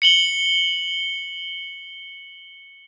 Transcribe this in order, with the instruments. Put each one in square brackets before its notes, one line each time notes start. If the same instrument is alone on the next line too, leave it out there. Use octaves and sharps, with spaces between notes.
[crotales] C#7 F#7 G7